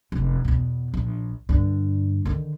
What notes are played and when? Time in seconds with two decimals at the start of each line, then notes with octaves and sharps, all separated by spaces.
0.12 F1
0.45 E2 B2
0.94 A#1
1.49 G2 D3
2.25 D3 D#3